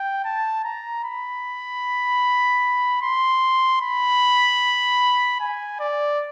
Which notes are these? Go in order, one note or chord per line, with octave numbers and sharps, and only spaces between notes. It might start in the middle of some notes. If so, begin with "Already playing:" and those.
Already playing: G5
A5
A#5
B5
C6
B5
G#5
D5